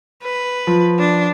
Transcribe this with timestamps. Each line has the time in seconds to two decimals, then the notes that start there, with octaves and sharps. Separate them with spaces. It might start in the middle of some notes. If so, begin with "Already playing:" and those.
0.23 B4
0.67 F3
0.99 D4